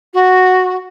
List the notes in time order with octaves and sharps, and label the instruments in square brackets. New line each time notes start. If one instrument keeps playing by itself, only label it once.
[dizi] F#4